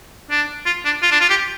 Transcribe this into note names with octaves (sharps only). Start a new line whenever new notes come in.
D4
F4
D4
F4
D4
F4
G4